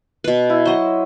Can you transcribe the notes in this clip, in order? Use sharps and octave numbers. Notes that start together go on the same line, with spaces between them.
B2 B4
E4
F#3 C5 D#5